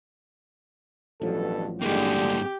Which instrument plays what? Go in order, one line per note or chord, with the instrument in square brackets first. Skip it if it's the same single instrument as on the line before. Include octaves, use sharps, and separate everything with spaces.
[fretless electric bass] A1 F3 F#3 [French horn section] G2 B2 A4
[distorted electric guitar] G2 A#3 [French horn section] D3 G#3 [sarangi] G4